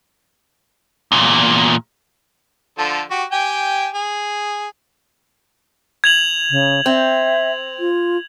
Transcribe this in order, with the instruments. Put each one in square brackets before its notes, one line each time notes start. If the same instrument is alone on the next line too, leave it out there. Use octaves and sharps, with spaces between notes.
[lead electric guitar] E2 A#2
[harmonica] D3 F3 A4
F#4 G4
G4 G5 G#5
G#4
[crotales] G#6 F7 F#7
[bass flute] C#3
[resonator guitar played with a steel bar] C4 [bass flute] E5
[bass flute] F4